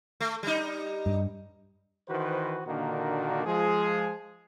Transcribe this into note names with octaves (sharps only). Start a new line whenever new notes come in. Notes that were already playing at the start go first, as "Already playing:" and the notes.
A3
G3 D#4
G2
D#3 E3 F#4 B4 C5
A#2 D3 D#3 A#3 D4 F#4
F3 G#3 G#4